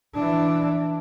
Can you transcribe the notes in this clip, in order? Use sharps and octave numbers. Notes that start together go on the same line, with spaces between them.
E3 D4